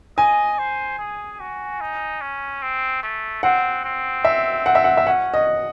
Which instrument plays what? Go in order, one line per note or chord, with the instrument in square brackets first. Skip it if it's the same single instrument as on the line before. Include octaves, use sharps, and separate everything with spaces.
[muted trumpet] D#5 [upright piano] G#5
[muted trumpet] C5
G#4
F#4
D#4
C#4
C4
A3
[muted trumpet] C4 [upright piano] F#5
[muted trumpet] C4
[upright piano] E5
F#5
E5
F#5
E5
[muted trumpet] C#4 [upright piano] F#5
[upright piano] D#5